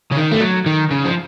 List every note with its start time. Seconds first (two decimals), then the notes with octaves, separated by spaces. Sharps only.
0.11 C#3
0.16 D#3
0.31 A3
0.40 F#3
0.66 D#3
0.91 C#3
1.05 F3